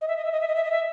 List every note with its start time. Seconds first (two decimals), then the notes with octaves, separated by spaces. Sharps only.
0.01 D#5
0.08 E5
0.17 D#5
0.25 E5
0.32 D#5
0.41 E5
0.48 D#5
0.55 E5
0.64 D#5
0.71 E5